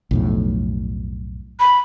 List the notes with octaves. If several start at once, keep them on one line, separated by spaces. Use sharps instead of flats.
B1 F2 A2
B5